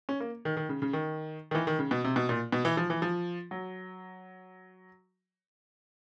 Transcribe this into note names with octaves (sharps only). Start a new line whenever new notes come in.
C#4
A#3
D#3
D#3
C#3
C#3
D#3
D#3
E3
D#3
C#3
B2
C3
B2
A#2
B2
E3
F3
E3
F3
F#3